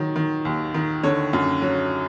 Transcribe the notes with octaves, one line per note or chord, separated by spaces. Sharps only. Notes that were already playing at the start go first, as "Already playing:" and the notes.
Already playing: D#3 F#3
D#3
D#2
D#3
D3 C#5
F#2
F#3